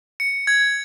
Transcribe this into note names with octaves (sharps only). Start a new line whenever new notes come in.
C#7
G#6